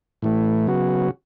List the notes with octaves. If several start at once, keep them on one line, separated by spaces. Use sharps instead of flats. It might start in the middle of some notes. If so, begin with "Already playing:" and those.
A2 E3 A3
C#3 F#3 B3 F#4